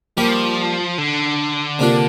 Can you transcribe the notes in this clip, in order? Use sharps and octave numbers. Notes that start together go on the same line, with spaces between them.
F3 G3 A#3 G4
D3
C3 A#3 D4 F4